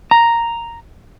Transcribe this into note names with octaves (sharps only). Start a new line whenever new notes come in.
A#5